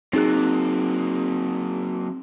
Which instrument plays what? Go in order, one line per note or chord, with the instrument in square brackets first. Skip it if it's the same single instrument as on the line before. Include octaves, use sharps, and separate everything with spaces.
[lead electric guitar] F#3 A#3 [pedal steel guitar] C4 F#6 [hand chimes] D#4 G#4